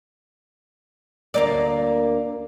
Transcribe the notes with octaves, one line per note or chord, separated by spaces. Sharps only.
D2 A#3 D5